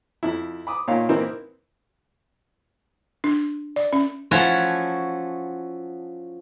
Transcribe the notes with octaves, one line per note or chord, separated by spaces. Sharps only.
F2 E4
B5 D6 D#6
A#2 D#3 C#5 F5
E3 A#3 C4 D#4 E4
D4
D5
C#4
F3 C#4 E4 F#4 A4 C#5